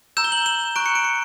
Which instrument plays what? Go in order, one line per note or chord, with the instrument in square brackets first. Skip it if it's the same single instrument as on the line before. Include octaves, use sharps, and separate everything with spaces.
[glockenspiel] A#5 E6 G6 E7
G7
F#7
E7
A#5 C#6 F#6 D7
C#7
D7
C#7